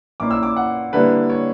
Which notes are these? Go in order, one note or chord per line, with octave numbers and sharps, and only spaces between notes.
A#2 A#3 C#4 E4 D6
E6
D6
F#5
D3 G3 A#3 E4 B4
C#5